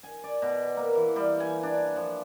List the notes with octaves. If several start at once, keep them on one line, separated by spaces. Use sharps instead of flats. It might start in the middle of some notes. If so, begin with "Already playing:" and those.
G#5
D5
B2
A#3
E3
G3
G#5
D4
F3